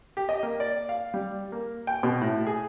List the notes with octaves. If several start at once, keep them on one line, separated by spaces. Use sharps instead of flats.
G4
D#5
A#3
D5
F5
G3
A#3
G5
B2
A2
G#4